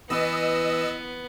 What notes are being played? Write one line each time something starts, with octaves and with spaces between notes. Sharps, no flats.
E3 B3 D#5 E6